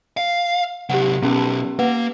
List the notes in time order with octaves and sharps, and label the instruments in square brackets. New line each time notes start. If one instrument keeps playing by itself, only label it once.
[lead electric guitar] F5
[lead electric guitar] C3 F#3 [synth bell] G4 F#5
[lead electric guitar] B1 [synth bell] B3 C#4 G4
[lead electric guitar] A#3 [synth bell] B4 F#5